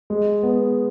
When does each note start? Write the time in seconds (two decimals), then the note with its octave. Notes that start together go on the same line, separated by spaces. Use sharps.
0.10 G#3
0.43 B3